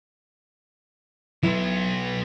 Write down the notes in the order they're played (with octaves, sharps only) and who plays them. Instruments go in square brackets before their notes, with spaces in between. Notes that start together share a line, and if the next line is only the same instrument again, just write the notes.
[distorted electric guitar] F#3 B3 [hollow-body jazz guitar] E4